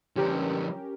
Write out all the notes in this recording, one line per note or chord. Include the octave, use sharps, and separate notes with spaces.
D3 F3 C#4 G4 A#4